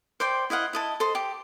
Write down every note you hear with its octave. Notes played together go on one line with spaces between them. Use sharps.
C5 D5 G5 C6
E4 D#5 F5 F#5
E4 D#5 A5
A4 C5 D#5
G4